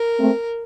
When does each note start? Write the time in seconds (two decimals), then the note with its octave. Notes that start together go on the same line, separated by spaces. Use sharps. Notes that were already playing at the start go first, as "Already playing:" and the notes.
Already playing: A#4
0.19 A3 C4